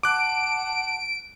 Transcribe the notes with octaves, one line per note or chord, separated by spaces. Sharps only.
F#5 A5 D6 F#6 D7